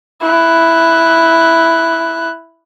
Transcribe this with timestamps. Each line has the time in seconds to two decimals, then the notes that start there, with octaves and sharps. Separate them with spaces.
0.22 E4 F#6